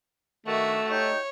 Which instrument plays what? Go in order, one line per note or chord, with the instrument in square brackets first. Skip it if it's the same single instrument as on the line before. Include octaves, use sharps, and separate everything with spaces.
[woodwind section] D#3 D4 [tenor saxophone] A3 [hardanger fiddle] F#4 E5
[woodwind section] D#4 G4 G5 [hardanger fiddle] C#5